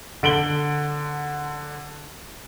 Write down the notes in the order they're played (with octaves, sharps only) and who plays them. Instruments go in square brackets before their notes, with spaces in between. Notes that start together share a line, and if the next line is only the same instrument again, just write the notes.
[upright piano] D3 D7 F#7 G7